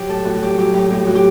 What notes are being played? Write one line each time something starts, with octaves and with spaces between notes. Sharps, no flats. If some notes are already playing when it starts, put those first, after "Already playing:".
Already playing: F#3 G4
A2 A4
A2 F#4
F#3 G4
F#3 G4
A2 G4
A2 G4
F#3 F#4
G4